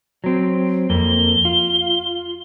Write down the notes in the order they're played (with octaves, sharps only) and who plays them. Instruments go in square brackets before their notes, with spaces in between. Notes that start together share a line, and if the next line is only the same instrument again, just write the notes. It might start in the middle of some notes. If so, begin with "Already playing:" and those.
[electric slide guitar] F#3 C4
[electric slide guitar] F2 A#3 [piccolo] G7
[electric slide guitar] F4